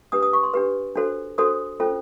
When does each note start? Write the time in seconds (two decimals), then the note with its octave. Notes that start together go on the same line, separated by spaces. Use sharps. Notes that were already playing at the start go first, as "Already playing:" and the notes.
0.12 D4 G4 B4 D#6
0.23 D#6
0.33 C#6
0.44 C6
0.54 D4 G4 B4
0.95 D4 F#4 A4 C5
1.38 D4 F#4 A4 C5 D#6
1.80 C#4 F4 A4 C5